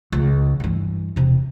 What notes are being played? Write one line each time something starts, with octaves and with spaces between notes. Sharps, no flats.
C#2
G2 E3
E1 C3